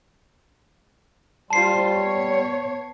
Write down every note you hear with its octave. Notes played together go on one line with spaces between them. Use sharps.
G3 F4 C5 A5 C7
B3 C#5